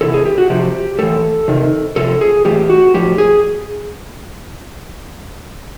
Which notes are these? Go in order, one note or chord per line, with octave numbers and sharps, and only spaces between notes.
C3 E3 A4
G#4
G4
F#4
C3 F3 G4
A2 E3 A4
C3 D#3
C3 F3 A4
G#4
A2 E3 G4
F#4
A2 F3 G4
G#4